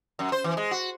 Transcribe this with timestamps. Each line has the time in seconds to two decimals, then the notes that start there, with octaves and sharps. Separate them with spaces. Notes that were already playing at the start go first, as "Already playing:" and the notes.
0.19 F#2
0.32 C5
0.44 E3
0.57 G#3
0.71 F#4